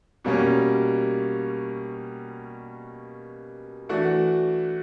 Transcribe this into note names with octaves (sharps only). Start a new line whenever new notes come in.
B2 G3 A#3 C#4
E3 A3 D4 F#4